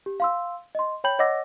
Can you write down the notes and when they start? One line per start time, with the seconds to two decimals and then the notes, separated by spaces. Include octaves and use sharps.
0.06 G4
0.20 F5 C6 E6
0.75 D#5 C6
1.04 C#5 G5 B5 G6 F#7
1.19 C#5 D#5 F#5 D6 E6 A#6